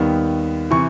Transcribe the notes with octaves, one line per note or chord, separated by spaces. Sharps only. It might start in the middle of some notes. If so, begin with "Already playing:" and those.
Already playing: D#2 D#3 G3 B3
C3 E3 C#6